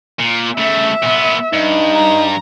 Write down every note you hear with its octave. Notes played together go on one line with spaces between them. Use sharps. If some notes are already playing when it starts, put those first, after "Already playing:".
A#2
C#3 A3 E5
A#2 B3
G2 D#4
A#5